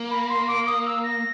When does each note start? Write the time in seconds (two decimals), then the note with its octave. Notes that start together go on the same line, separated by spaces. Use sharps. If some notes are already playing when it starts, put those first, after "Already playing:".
Already playing: A#3
0.11 B5
0.23 B5
0.29 C6
0.47 D6
0.67 D#6
0.86 E6
1.03 A#6